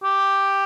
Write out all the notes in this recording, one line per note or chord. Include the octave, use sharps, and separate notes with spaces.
G4